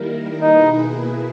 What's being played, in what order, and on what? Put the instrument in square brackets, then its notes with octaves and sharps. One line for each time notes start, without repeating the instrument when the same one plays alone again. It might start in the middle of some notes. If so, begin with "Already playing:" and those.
Already playing: [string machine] D#3 G3 A#3 E4 A#4
[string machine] B2 A#3 E4 G#4 B4 [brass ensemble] D#4